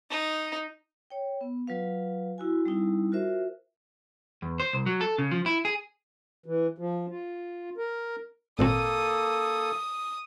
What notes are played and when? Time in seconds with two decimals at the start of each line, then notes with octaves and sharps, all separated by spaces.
0.10 D#4
1.10 C#5 G5
1.41 B3
1.67 F#3 F4 B4 F5
2.38 E4 F#4 G#5
2.65 G3 C4 D#4 E4
3.12 F4 F#4 A#4 C5 E5
4.42 E2
4.60 C5
4.73 C2
4.86 F#3
5.01 A4
5.18 C#3
5.31 F3
5.46 E4
5.65 G#4
6.46 E3
6.78 F3
7.09 F4
7.78 A#4
8.59 G#1 A#2 A#3 C4 A4 D#6